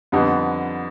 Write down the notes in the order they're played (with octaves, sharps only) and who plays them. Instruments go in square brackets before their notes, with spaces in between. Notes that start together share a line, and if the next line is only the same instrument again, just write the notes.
[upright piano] F2 D3 G3 B3 D#4